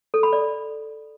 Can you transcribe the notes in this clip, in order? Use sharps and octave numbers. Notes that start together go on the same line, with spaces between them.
A4
B5
D5